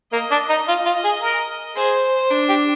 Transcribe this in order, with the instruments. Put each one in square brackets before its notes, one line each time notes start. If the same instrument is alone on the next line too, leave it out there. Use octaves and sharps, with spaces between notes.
[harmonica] A#3 [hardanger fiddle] D#5
[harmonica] D4
D#4
F4
F4
G#4
A#4
[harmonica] G#4 [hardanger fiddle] C5
[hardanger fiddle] D4
[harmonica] G4